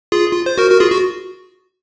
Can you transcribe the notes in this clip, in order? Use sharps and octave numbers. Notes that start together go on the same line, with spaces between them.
F4 G#4
F4
C5
F#4 A#4
F#4 A#4
F4 G#4
F#4